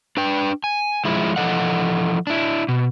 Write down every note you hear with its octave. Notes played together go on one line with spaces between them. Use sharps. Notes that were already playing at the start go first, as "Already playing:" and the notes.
D4 B4 G5
G#5
F3 G#3 E4
E3 F3 A4 D#5 F#5
D4 E4
B2